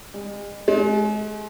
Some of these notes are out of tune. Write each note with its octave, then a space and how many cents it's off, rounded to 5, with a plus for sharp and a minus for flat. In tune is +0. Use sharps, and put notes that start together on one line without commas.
G#3 -40
G#3 +35